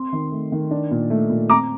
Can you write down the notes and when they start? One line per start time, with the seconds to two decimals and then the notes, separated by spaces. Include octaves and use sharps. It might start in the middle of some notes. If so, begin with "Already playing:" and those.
Already playing: C4 C6
0.13 D#3
0.32 A3
0.52 D#3
0.71 D4
0.91 A#2
1.10 A3
1.30 A#2
1.49 C4 A#5 D6